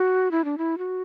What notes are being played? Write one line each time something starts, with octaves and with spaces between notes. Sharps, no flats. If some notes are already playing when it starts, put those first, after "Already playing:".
Already playing: F#4
E4
D4
E4
F#4